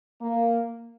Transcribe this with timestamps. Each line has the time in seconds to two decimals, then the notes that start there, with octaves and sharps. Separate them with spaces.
0.20 A#3